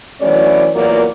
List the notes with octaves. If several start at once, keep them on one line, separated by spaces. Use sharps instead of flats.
E3 F#3 A3 C#4 D5
E2 F#3 A#3 F4 A#4 D5